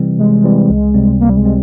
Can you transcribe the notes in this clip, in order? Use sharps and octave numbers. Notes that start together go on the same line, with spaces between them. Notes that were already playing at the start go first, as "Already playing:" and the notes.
Already playing: C3 E3 G3 C4
C3 G#3
E3 G3 C4
C#2
C3 G3 C4
C#2 A#3
G3
G#3
G3 C4